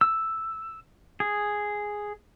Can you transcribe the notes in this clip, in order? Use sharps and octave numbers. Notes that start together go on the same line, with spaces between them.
E6
G#4